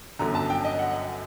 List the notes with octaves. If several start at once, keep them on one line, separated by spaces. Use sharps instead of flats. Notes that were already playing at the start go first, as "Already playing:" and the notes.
G1 F#2 D3 A#5
A5
G5
D#5
F#5